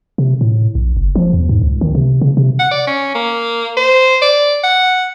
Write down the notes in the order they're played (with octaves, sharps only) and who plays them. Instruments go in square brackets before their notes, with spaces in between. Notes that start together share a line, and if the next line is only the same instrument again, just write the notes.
[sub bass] C3
A2
A#1
F#1
F3
E2
G#2
C#2
D#3
C3
C#3
C3
[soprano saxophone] F#5
D5
C#4
A#3
C5
D5
F#5